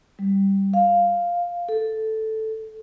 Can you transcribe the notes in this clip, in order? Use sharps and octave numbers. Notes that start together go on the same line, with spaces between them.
G3
F5
A4